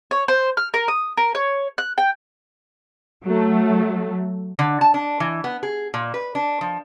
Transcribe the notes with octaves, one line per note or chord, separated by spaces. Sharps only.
C#5
C5
F6
A#4
D#6
A#4
C#5
F#6
G5
F#3 A3
D3
A5
D4
E3
B3
G#4
A#2
B4
D4
F3